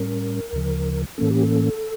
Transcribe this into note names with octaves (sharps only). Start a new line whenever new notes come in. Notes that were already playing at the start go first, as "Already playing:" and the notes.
Already playing: A2 G3 C#4 A#4
D2 C#3 F3
A2 E3 A#3 C#4 A4
G4
A4